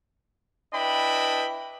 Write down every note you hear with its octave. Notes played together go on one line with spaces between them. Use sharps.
D4 E4 B4 D#5 G5 B5